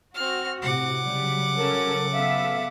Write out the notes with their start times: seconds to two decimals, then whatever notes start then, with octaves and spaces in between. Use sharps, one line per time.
0.14 C4 F#4 F6
0.62 A2 C3 F#5 D6
1.04 C#3 F#3 G3
1.57 C#4 A4 A#4
2.13 B3 A4 E5 F5